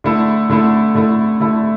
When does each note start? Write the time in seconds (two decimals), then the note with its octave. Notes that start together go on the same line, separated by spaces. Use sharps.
0.04 D3 A3 E4 A4
0.49 D3 A3 E4 A4
0.95 D3 A3 E4 A4
1.40 D3 A3 E4 A4